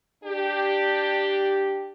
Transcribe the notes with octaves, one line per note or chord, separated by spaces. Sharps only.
D4 G4